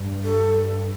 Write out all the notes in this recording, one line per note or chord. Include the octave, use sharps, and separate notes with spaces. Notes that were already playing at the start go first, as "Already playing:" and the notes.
Already playing: G2
A4